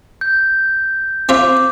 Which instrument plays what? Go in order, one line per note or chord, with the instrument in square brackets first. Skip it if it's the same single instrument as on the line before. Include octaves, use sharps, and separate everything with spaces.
[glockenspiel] G6
[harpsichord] C4 F4 E5 [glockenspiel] D6